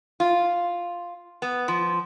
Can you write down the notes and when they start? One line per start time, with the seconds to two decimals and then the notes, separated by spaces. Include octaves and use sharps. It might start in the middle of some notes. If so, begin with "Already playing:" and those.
0.20 F4
1.42 B3
1.68 F3